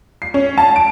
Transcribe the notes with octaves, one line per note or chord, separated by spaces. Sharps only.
C7
C#4
A5
D7